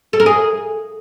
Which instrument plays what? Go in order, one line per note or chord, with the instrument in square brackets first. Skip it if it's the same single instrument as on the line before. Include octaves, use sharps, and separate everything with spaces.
[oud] A4
A#4
G#4